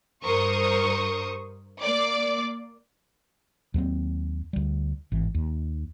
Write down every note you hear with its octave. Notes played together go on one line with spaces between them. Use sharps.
G2 A#4 C5 C#6 D#6
A#3 D5 D6
D#2 F#3 A3 C4
D2 G3
G#1 E3
D#2